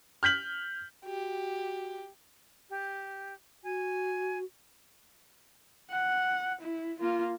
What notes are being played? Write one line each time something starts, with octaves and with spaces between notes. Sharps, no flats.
F6 G6 B6 F#7
F#4 G4
G4
F#4 G#5
F#5
E4
A#3 F4